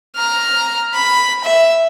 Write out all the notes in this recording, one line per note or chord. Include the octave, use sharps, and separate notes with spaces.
A#5 F6
B5
E5